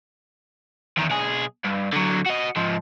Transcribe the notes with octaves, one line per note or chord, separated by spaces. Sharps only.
E2 D#3
B1 G#4
G2
D3 F#3
F#4 D#5
G#2 F3